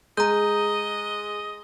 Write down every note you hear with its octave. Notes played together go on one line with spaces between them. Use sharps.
G#3 D#5 A#5 G6